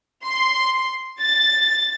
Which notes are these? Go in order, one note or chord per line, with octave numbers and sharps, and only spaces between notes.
C6
A6